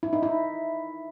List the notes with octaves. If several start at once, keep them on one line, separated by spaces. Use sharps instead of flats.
E4
D#4
E4